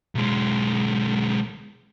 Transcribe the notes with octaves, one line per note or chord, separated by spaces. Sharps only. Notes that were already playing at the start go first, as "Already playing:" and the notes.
B1 G#3